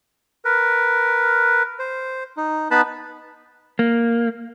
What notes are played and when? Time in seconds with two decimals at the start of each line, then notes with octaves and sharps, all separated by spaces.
0.45 A#4 B4
1.79 C5
2.37 D#4
2.71 B3 D#4 B4 A5 B5
3.79 A#3